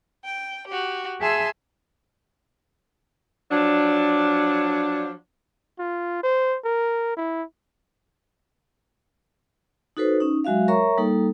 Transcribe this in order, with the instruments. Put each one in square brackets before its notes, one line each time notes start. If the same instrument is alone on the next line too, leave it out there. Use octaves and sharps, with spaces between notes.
[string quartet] G5
F#4 G4
G#4 E5 G#5 A5 C6 E6
[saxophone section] F3 F#3 D4
[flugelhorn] F4
C5
A#4
E4
[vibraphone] D#4 F#4 A4 B4 C5
C#4 D#4
F#3 G#3 F#4 E5 F5
A#4 C#5 E5 A#5 C#6
G3 A#3 D#4 A4